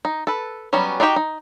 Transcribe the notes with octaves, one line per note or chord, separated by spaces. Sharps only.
D#4
A4 B4
F#3 G3 B3 C#4
D4 D#4 F#4 G4 G5
D#4